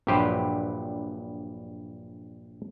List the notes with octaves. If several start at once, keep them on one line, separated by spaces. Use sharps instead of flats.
A#1 G2 F#3 G4 B4 C5